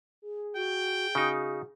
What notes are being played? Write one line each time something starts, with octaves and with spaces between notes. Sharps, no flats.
G#4
F#4 G5
C#3 D#4 F#4